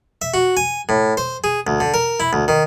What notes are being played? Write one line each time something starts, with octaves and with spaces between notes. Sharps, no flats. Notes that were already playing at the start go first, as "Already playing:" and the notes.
E5
F#4
G#5
A2
C5
G#4
D2
D3
A#4
E4
D2
D#3